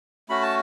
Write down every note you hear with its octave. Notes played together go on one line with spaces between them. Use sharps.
A3 C#4 F#4 B5
A5